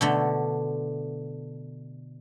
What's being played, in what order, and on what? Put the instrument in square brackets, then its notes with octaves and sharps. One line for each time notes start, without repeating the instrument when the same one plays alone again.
[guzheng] B2 D3 A3